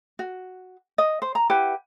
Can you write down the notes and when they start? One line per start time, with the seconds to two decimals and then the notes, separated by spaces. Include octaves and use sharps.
0.19 F#4
0.98 D#5
1.22 C5
1.35 A#5
1.50 E4 G4 B4 F#5